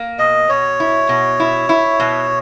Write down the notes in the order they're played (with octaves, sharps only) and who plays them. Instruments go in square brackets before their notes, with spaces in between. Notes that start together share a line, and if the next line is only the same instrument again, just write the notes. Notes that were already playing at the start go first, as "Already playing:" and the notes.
Already playing: [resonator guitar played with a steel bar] A#3
[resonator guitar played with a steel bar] B2 [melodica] D#5
[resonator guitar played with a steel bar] B2 [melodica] C#5
[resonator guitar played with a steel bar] E4
B2
E4
E4
B2